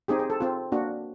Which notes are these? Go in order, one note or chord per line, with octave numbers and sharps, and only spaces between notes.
C4 D#4 G4 G#4
G#4
A4
C4 F4
A#3 D4 F#4